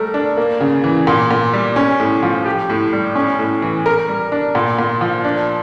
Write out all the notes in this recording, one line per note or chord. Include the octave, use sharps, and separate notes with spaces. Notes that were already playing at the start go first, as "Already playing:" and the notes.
Already playing: G3 A3 A#4
D4
A#3
C#3
E3
A#2
A#2
G3
C#4
A2
F3
G4
A2
G3
C#4
A2
E3
A#4
G3
D4
A#2
A#2
F3
D4